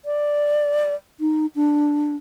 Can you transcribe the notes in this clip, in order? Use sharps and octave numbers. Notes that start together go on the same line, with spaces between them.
D5
D#4
D4